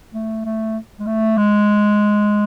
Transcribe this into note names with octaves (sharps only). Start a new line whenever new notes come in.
A3
A3
G#3
A3
G#3